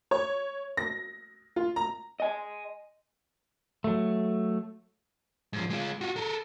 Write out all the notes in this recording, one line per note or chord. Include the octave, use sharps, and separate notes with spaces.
C#5
A#6
F4
A#5
D#5 G#5
F#3 A3
G#2 F3
G#3 F4
F4 F#4
A4 A#4